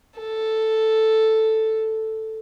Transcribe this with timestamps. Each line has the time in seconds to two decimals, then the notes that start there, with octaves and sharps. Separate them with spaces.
0.19 A4